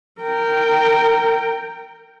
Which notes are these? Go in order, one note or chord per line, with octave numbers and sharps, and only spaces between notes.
A#4 G5